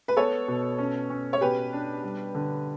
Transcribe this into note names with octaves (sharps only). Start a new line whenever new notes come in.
B4
B3 A4 C#5
B2
C#4
C#4
C#5
B2 G4 B4
D4
G3
D3